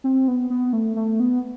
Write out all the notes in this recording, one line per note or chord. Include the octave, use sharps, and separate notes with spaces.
C4
B3
B3
A3
A3
B3